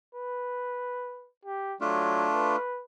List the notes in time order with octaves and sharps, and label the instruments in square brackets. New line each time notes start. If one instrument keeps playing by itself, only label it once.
[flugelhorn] B4
G4
[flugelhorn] F#3 [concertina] A3 D4 F4
[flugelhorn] B4